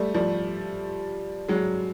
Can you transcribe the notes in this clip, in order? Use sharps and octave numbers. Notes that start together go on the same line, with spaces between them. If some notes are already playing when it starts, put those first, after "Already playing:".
Already playing: G3 A3
F3 G3
F#3 G#3